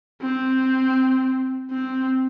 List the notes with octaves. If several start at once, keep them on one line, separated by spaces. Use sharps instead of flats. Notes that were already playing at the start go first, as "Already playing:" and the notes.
C4
C4